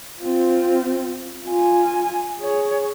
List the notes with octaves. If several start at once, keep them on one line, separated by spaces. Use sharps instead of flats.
C4 F4
F4 G#5
G#4 C#5